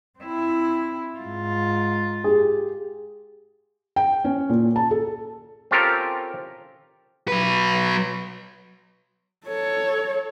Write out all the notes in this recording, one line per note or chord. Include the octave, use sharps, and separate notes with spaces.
C4 E4
G#2 F4
G4 G#4
G5
C#4
A#2
A5
A4
C4 C#4 F4 G4 A4 A#4
F#3 B4
A4 C#5